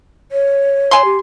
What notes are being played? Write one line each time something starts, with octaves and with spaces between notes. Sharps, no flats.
C#5
G#5 C6
G4